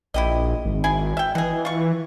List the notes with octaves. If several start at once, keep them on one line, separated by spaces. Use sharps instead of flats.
A#1 E4 G4 D#5
G#1
E4 G#4 G#5
E5 G5
B2 E3 G#4
F4 C#6